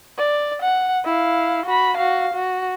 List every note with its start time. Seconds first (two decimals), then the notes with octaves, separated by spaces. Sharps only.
0.18 D5
0.62 F#5
1.04 E4 F5
1.65 F#4 B5
1.97 F#4 F5
2.33 F#4